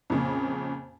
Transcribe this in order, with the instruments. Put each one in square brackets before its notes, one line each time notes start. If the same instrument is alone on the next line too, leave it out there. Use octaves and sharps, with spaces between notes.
[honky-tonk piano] F2 A#2 C#3